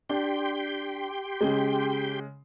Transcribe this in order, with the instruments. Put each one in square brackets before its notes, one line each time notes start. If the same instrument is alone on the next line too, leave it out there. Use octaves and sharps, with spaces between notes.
[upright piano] D4 [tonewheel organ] G4 G5 C6
[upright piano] C#3 G#3